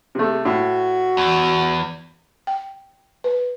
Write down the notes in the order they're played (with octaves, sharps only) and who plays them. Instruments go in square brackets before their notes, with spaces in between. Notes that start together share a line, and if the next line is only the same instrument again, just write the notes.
[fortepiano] C3 A3
[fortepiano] A2 [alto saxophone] F#4
[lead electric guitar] E2
[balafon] G5
B4